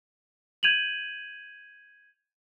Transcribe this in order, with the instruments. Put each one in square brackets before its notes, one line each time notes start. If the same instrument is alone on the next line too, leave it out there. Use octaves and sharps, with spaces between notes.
[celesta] G6 G#6 D#7 F7 F#7